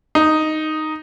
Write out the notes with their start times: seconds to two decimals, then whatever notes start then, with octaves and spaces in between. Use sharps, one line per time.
0.15 D#4